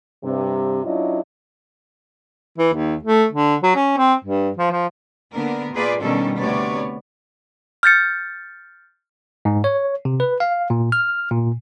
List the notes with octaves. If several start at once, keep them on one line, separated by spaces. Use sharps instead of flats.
G2 C3
F#3 C#4 D4 E4 F4 D#5
E3
D#2
A3
D3
F#3
C#4
C4
G2
F3
F3
D3 A#3 B3 D4 A#4
A#2 A#3 F4 G#4 B4 D5
B2 D#3 G3 C#4 D4 A4
D2 C3 B3 C#5 D5
F6 G6 A6 C#7
G#2
C#5
C3
B4
F5
A#2
F6
A#2